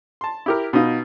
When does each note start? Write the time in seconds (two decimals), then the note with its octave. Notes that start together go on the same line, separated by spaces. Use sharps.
0.21 A5 C6
0.46 E4 G4 A#4
0.73 B2 B3 D#4 F4